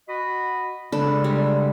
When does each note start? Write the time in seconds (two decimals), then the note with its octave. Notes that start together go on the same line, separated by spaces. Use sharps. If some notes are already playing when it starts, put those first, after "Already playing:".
0.09 F#4 D#5 B5
0.92 C#3 G#3 D4 A4 B4
1.24 G3